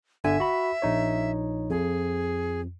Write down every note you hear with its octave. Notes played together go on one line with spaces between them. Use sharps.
G1 D3 E5 G#5
F#4 B5
A#1 D#4 C#5
F2 G#4